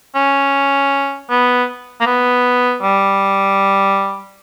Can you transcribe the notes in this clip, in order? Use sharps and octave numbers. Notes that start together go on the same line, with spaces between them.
C#4
B3
A#3
B3
G3